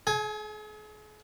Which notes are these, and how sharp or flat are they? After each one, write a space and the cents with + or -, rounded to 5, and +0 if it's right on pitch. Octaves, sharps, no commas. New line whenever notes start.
G#4 +40 G#5 +0